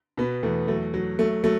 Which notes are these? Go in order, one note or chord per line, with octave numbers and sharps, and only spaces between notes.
B2 B3
E2 A3
F#3 A3
F#3
F#3 A3
F#3 A3